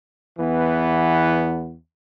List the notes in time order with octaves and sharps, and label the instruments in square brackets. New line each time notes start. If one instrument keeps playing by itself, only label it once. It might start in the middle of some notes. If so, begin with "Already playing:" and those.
[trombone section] E2 E3 B3